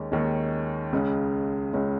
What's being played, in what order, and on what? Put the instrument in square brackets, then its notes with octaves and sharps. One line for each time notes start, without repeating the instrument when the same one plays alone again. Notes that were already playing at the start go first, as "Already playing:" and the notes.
Already playing: [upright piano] D#2 D#3 G#3 C#4
D#2 D#3 G#3 C#4
C#2 C#3 G#3 C#4
C#2 C#3 G#3 C#4